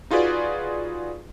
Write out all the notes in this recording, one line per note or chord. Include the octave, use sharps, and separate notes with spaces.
D#4 F4 F#4 G#4 B4 D5